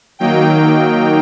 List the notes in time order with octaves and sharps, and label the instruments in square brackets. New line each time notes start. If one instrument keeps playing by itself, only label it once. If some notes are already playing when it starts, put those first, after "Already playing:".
[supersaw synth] D#3 F#3 A#3 D#4 G5